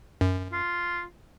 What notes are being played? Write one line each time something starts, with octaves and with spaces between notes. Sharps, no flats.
F#2
F4